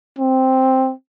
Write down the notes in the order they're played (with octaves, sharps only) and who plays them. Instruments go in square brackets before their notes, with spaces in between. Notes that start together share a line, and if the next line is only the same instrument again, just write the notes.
[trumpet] C4